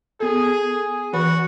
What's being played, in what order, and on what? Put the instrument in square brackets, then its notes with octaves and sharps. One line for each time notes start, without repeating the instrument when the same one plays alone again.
[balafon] B3 A4 [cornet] G#4
[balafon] E3 B4 B5 [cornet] F#4